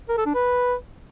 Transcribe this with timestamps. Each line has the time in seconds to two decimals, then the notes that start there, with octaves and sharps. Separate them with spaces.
0.09 A#4
0.18 A4
0.26 D4
0.35 B4